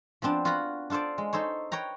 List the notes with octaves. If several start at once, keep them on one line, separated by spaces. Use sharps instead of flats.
F3 B3 C4 D4
F4 F#4 B4 F5 F#5 B5
D4 F4 A4 C5 D5
G#3
D#4 A4 C5 C#5
B4 C#5 G5 A#5